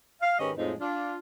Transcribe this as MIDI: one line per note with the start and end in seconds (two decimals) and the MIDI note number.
0.21 0.38 77
0.39 0.52 44
0.39 0.52 51
0.39 0.52 61
0.39 0.52 67
0.39 0.52 71
0.39 0.52 75
0.57 0.73 41
0.57 0.73 45
0.57 0.73 53
0.57 0.73 56
0.57 0.73 60
0.57 0.73 63
0.79 1.19 62
0.79 1.19 65